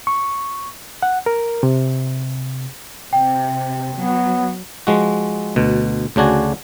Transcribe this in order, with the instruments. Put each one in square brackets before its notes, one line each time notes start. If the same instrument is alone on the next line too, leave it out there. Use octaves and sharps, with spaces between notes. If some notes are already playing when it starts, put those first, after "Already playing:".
[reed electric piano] C#6
F#5
A#4
C3
[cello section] C3 [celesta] G5
[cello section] F#3 [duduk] B3
[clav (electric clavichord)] F3 G#3 F#4
D2 B2
D2 C#3 D4 F#4 G#5